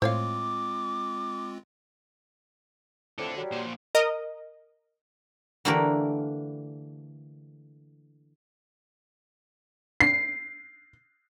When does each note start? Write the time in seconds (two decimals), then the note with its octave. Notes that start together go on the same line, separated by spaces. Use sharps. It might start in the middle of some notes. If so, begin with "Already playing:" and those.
0.02 A2 G#3 C4 F4 C5 C#5 F5 D6
3.19 F2 A2 A4 D5
3.36 F#3 G3
3.52 A#2 C5
3.95 A#4 D#5
5.65 D3 E3 A3 A#3 G4 A#4
10.00 C7